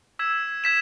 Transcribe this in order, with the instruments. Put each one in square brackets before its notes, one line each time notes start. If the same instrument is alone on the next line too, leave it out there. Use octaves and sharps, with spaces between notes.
[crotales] E6 G#6 B6 E7
G#6 B6 E7